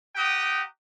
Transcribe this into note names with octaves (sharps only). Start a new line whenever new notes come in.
G4 F#5 G5 A#5 D#6